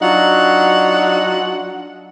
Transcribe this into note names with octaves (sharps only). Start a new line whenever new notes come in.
F#3 D4 D#4 F4 F#5